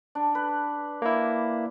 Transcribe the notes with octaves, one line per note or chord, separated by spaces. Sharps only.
D4
B4
A#3 E4